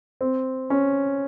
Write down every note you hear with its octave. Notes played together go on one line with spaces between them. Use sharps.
C4
C#4